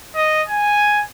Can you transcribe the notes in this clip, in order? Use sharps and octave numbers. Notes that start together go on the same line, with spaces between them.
D#5
G#5